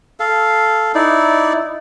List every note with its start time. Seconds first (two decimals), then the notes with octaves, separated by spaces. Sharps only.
0.20 A4 F5
0.95 D#4 E4 D5